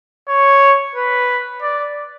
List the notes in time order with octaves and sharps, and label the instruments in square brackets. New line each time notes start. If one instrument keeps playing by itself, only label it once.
[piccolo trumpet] C#5
B4
D5